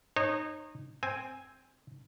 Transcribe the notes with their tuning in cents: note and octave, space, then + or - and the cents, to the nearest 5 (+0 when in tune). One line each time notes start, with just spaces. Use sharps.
D#4 -20 C#5 -35
C4 +0 G#5 +0